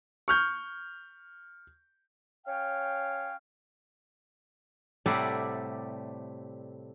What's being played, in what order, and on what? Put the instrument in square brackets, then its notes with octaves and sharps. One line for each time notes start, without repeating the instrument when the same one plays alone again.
[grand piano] C#6 F6 G6
[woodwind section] C#4 C#5 F5 G5
[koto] A2 C3 G3 A3 D5 F#5